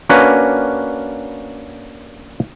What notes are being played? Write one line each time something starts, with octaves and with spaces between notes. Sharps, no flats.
A#3 C#4 D4 F#4 B4